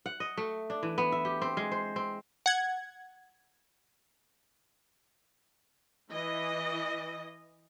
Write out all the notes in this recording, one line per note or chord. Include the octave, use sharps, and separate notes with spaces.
F#5
D#5
A3
D4
E3
B3
E5
G4
C4
G#3
C5
C4
F#5 G#6
E3 D#5